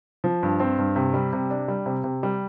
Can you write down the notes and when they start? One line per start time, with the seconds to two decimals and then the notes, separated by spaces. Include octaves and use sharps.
0.24 F3
0.43 G2
0.60 C4
0.78 G2
0.96 C3
1.14 G3
1.33 C3
1.50 D4
1.68 G3
1.86 C3
2.04 C3
2.23 G3